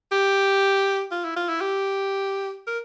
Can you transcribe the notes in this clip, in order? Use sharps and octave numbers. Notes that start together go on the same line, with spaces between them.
G4
F4
E4
F4
E4
G4
A#4